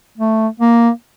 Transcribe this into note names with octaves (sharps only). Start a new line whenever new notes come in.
A3
A#3